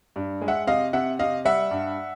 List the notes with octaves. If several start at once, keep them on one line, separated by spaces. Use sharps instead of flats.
G2
G#3
E5 F#5
C3 D#5 F5
C3 E5 F#5
C3 D#5 F5
G3 E5 F#5
G2